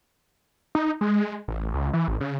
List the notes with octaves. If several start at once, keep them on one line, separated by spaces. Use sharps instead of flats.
D#4
G#3
A1
C#2
E3
A1
C#3